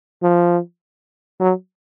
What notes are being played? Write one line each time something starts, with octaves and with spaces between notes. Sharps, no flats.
F3
F#3